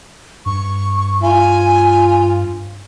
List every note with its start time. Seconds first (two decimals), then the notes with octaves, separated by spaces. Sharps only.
0.46 G2 C#6
1.23 F4 G#5